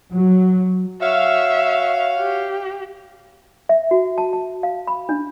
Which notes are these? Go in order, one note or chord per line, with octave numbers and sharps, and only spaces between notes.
F#3
F#4 C#5 E5 F5
G4
E5
F#4
A5
A5
F5
B5
D4